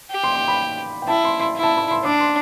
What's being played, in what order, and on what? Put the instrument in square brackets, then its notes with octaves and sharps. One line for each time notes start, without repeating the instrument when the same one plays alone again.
[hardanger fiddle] G4
[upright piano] C6
C6
B5
G5
[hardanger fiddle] E4 [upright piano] A5
[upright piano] C6
C6
[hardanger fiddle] E4
[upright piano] A5
B5
C6
[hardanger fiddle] D4 [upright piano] D6
[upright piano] C6